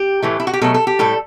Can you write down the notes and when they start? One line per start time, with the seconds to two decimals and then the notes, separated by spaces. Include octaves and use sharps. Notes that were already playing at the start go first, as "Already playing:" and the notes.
Already playing: G4
0.22 A2 E3 A3
0.40 E4
0.47 F#4
0.53 G4
0.61 B2 F#3 A3 A4
0.74 A4
0.87 G4
0.99 A2 G3 A4